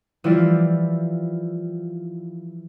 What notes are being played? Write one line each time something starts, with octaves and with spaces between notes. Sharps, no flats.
E3 F3 G3 E4 F4 D5